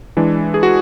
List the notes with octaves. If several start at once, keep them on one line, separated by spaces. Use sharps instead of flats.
E3 G#3 D4
G#4
F#4